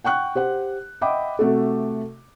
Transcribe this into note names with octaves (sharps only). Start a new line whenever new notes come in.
F#5 G5 C#6 F#6
G4 C5 F#5
D#5 E5 F#5 G5 B5 D6
C3 A3 F#4 A4